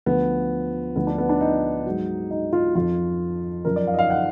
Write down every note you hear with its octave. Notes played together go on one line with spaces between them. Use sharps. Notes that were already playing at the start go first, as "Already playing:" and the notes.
D2 D3 F3 B3
D2 D3 F3 B3
D4
B3
D4
D#4
G#2 F#3
D#4
F4
F2 F3 F4
F#2 F3 A#4
D5
F5
D#5
F5
F#5